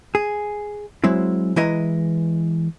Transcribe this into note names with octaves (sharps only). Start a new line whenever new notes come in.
G#4
F#3 G#3 C4 E4
E3 G#3 E4 B4 D#5 A#5